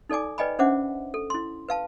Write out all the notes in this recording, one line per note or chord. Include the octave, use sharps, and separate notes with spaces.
D#4 A4 D5 G#5 D6
B4 D5 D#5 G5 G#5 B5
C#4 D4 C5 E5 F#5 D6
A4
E4 C6
B4 F5 A5